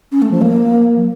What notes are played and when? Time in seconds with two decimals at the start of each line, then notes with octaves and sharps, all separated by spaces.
0.12 C#4
0.22 A3
0.31 F3
0.41 A#3
0.96 F#3